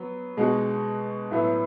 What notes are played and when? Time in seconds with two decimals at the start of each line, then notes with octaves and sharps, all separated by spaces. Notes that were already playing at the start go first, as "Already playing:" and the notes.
Already playing: F#3 B3
0.37 B2 G#3 D#4 F#4
1.31 A2 F#3 B3 E4